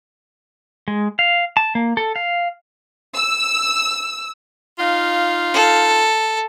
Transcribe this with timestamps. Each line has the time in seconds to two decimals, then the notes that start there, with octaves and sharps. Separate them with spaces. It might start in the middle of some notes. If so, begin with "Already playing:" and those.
0.88 G#3
1.19 F5
1.57 A5
1.75 A#3
1.97 A4
2.16 F5
3.14 E6
4.78 D#4 F4 F5
5.54 A4